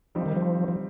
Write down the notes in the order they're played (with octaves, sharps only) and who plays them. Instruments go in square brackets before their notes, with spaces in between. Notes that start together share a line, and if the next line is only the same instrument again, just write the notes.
[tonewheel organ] F3 [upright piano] G3 C4 D#4
[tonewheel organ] D#3
F3
F3